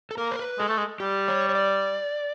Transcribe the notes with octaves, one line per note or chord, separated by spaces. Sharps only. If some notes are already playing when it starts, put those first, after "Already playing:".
A4
A#3 A#4
C5
B4
G#3 A4
A3
G#3
G3 G4
C#5
C#5
D5